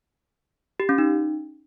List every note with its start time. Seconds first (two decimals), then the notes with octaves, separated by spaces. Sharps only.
0.80 G4
0.89 C#4
0.98 D#4